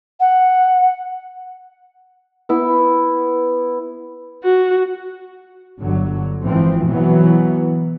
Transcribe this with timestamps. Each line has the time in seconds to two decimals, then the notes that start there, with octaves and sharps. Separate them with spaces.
0.20 F#5
2.49 B3 E4
4.43 F#4
5.80 G1 D3 F#3
6.43 G#1 E3 F3 C4
6.88 B2 E3 F#3 B3